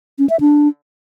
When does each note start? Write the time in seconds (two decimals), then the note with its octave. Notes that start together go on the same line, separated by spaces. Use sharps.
0.19 C#4
0.30 E5
0.40 D4